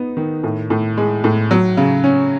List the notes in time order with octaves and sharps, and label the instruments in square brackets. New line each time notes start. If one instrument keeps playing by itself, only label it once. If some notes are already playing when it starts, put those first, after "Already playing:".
Already playing: [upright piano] B3 D#4
D#3
A2
A2
G#3
A2
F#3
C#3
C#4